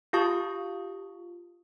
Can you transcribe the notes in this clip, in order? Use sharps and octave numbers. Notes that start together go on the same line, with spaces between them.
F4 G4 F5 A5 C#6 D#6